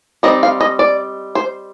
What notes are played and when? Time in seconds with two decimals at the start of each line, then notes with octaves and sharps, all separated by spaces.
0.23 G3 C4 D#4 D#5
0.43 F5
0.61 D#5
0.79 D5
1.35 C5